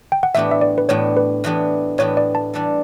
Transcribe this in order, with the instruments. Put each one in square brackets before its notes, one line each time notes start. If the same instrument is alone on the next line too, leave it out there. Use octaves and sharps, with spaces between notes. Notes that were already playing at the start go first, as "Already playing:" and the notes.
[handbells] G5
F#5
[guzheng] A2 E3 B3 D4 G4 [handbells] E5
[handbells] E5
D5
B4
[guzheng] A2 E3 B3 D4 G4 [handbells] C#5
[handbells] B4
[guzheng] A2 E3 B3 D4 G4
[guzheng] A2 E3 B3 D4 G4 [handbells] C#5
[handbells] D5
A5
[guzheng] E3 G3 D4 A4